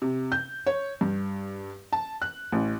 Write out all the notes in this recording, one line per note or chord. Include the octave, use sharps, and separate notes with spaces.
C3
G6
C#5
G2
A5
F#6
A1